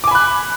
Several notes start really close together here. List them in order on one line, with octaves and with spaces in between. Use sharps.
D6 G#5 B5 F#6